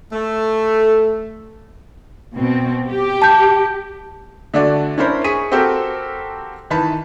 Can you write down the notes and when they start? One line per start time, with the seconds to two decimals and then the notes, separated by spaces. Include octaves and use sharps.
0.12 A3
2.34 B2 C4
2.88 G4
3.22 A5 G6
4.54 D3 A3 D4 F#4 D5
4.98 C#4 D4 E4 A#4 C5 B5
5.24 G#4 C#6 B6 D#7
5.52 C4 F#4 G4 A4 A#4
6.70 D#3 E3 B4 A5 B5